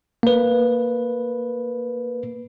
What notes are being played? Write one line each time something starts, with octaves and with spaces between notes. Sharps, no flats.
A#3 B4